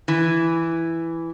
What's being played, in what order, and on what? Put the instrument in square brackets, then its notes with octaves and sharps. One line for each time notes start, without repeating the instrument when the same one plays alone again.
[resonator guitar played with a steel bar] E3